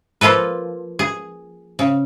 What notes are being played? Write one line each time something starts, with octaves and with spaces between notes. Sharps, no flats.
F3 A#3 F4 A4 B4
G#4
C#3